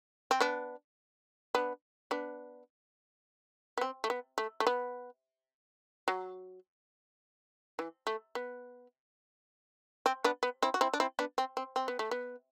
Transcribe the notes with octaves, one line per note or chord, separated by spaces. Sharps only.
C4
B3 D4
B3 D4
B3 D4
B3
C4
A3
B3
A3
A3
B3
F#3
E3
A3
B3
C4
B3 D4
B3
C4 E4
F#4
C4 E4
D4
C4 E4
B3 D4
C4
C4
C4
B3
A3
B3